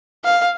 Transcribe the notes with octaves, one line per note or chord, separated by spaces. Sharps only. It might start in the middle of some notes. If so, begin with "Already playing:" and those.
F5